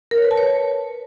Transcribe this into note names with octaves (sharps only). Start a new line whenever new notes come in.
A#4
C#5
B4
A5
C#5